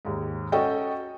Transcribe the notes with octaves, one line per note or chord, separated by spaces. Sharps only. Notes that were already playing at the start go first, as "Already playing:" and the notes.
D#2 G#2
C#4 F#4 A4 D#5 G5